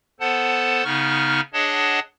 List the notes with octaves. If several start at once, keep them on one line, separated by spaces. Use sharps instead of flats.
B3 A4 C5 F#5 A5
C#3 B3 D#4 C#6 F6
D4 G#4 C#5 D#5 F#5 A5